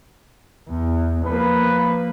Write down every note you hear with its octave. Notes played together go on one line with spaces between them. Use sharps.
E2
F3 A#3 B4